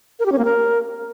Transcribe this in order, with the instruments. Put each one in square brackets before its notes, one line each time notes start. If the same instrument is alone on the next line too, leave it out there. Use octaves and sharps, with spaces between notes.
[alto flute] A#4
G4
C#4
A#3
A#4